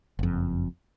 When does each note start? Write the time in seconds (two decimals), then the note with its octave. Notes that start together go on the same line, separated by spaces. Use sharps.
0.19 F#1 F2